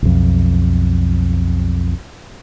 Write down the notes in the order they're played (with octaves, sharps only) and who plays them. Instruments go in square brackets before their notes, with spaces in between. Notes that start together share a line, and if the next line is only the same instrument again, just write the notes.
[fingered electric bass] B1 F2